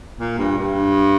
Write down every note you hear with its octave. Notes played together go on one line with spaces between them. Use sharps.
A#2
G2
G2